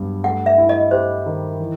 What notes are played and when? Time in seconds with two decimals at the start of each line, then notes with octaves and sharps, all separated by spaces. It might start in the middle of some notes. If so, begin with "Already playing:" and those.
Already playing: G2 F#3 B3
0.24 A3 F#5
0.46 E5
0.58 E4
0.69 D#5
0.91 G4 C5
1.26 D#3
1.60 E3